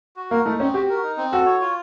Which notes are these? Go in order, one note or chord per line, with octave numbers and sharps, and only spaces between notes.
F#4
A#3 A#4
A3 D#4
C4 C#4
F#4 G4
A#4
D#4
C4
F#4 A4
C#5
F4